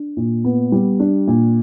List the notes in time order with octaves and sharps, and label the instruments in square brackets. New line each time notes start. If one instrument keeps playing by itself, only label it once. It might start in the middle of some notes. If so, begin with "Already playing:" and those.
Already playing: [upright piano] D4
A#2
B3
G3
D4
A#2